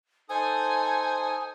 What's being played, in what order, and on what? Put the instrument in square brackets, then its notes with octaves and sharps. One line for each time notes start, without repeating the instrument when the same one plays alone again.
[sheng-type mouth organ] D#4 A4 D#6 [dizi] C5 [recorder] G#5